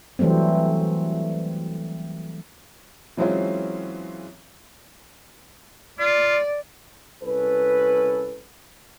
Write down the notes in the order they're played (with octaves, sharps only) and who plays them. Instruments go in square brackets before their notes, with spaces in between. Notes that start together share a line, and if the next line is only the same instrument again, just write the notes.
[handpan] E3 F#3 G3 A3 C4
[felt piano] E3 F#3 G#3 C4 C#4 F4
[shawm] F4 [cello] D5
[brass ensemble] C2 C#4 A4 B4